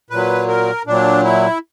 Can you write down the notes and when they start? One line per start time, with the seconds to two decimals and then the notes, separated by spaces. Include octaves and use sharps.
0.10 A#2 F#3 B4
0.48 A#4
0.86 A#2 F#3 D4
1.24 E4